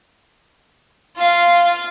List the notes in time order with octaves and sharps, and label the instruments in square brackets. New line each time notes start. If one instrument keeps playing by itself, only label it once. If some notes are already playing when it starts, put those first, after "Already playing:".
[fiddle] F4 F5